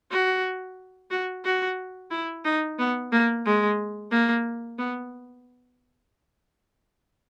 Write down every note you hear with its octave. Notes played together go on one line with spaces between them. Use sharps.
F#4
F#4
F#4
E4
D#4
B3
A#3
G#3
A#3
B3